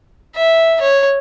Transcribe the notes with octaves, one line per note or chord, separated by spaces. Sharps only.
E5
C#5